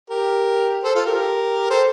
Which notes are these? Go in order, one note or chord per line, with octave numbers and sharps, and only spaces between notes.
G4 A#4
A4 C5
F4 A4
G4 A#4
A4 C5